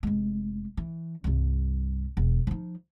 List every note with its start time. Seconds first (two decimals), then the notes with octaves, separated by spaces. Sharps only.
0.03 F1 G#3
0.77 E3
1.24 C2 G2
2.17 E1
2.47 F3 D#4